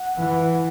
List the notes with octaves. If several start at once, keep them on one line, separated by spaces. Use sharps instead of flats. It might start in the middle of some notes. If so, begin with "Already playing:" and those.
Already playing: F#5
E3